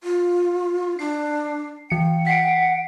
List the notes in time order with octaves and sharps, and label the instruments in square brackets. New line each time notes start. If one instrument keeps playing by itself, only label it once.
[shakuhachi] F4
[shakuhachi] D4 [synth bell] C7
[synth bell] E3 C#7 [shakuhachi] G5
[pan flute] F#5 [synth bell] B6 C7 D7